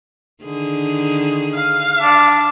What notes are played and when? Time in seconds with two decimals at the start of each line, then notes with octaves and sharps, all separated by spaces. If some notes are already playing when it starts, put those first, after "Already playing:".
0.43 D3 D#3 G#4
1.54 F5
2.02 D4